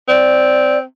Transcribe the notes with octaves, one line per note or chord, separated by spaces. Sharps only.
C4 D5